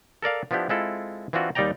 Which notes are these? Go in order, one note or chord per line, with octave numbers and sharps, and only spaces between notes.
A4 A#4 D5 F5
F3 B3 D4 E4 G4
G#3 C4 E4 F4 A4
E3 C4 D4 F4 F#4
D#2 G3 D#4 D5 G5 A#5